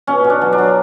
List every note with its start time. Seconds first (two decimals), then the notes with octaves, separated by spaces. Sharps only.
0.07 B2 C#4
0.24 B2
0.30 D4
0.41 F#3
0.53 D4
0.58 F#3